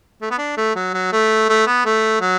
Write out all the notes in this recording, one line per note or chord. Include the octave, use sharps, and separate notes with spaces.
A3
B3
D4
A3
F#3
F#3
A3
A3
B3
A3
F#3